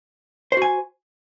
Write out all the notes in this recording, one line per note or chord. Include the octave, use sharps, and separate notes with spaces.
F#4 C5 G#5